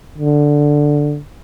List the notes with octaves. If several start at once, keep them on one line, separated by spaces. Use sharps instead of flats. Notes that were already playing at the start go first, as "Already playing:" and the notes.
D3